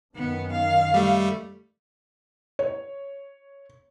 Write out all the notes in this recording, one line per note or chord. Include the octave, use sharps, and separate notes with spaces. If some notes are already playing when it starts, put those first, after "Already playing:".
F#2 D#3 B3
F5
G3 A3
C#5